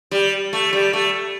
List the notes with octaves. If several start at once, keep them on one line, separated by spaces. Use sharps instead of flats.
G3
A3
G3
A3